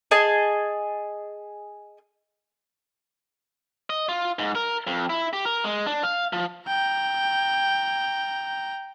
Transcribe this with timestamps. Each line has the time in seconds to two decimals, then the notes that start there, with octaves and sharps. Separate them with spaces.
0.11 G#4 D#5 G#5 A5
3.90 D#5
4.09 F4
4.39 G#2
4.55 A#4
4.87 F2
5.10 E4
5.33 G4
5.45 A#4
5.64 G#3
5.86 D4
6.03 F5
6.33 F3
6.68 G5 A#5